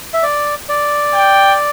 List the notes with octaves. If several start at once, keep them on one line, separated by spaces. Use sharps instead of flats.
E5
D5
D5
G5